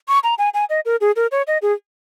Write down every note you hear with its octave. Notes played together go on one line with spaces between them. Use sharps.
C#6
A#5
G#5
G#5
D#5
A#4
G#4
A#4
C#5
D#5
G#4